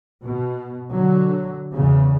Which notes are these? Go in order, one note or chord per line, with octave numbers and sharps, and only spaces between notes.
B2
D3 F#3
E2 C#3